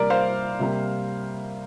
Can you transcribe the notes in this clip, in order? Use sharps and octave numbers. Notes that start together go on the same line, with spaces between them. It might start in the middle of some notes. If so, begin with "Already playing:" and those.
Already playing: C3 G3 A#3 A#4 D5
C5 F5
C3 G3 A#3